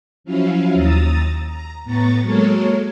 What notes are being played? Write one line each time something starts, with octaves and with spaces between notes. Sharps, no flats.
F3 F#3 C#4 E4 F5
D#2 A#5 D#6 E6 A6
A#5
A2 B3 A#5 C#6 A6
F#3 G#3 A#3 A4 A#4 C#5